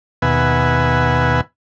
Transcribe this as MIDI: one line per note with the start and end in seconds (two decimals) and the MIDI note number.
0.22 1.41 39
0.22 1.41 47
0.22 1.41 71
0.22 1.41 76
0.22 1.41 78
0.22 1.41 80